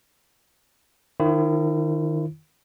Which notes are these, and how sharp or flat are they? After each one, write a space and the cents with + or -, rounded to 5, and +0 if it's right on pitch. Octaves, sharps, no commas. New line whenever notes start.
D#3 -15 E4 +35 C5 +5